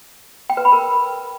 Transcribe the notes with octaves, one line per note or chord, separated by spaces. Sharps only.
G5
B4
B5
A#4